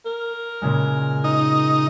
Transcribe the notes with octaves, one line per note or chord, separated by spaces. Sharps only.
A#4
A#2 C#3 G#3
D#4